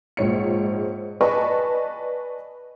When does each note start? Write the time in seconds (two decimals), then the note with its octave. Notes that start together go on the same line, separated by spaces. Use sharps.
0.17 A#1 G#2 C#5 C#7
1.21 B4 D5 D#5 G#5 A5 C#6